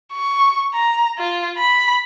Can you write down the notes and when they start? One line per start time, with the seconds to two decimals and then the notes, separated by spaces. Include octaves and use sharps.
0.13 C#6
0.74 A#5
1.18 F4
1.58 B5